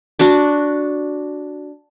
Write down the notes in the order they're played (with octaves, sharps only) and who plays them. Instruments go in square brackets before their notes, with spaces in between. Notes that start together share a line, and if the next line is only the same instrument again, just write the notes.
[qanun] D4 F#4 D6